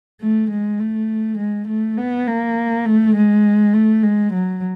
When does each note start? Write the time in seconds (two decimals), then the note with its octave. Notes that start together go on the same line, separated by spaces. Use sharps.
0.21 A3
0.51 G#3
0.80 A3
1.38 G#3
1.68 A3
1.98 B3
2.27 A#3
2.86 A3
3.16 G#3
3.74 A3
4.03 G#3
4.33 F#3